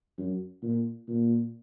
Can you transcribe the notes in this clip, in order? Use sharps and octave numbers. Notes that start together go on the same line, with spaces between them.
F#2
A#2
A#2